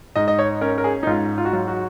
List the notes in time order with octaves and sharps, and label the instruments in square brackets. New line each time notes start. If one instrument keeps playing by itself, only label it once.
[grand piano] G#2 D#5
D#5
C#5
C#4 A#4
A#4
G#4
D#4
G#2 F4
F4
F#4
F#3 F4
F#4